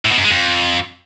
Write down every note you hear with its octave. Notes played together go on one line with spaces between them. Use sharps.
A2
B2
F#2
G#3
F2